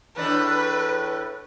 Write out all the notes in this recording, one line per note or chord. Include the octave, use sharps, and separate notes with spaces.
E2 A2 D4 B4